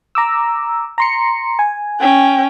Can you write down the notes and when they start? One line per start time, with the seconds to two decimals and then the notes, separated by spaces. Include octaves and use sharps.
0.15 A#5 D6 E6
0.98 A#5 C6 C#7
1.59 G#5
2.00 C#4 G5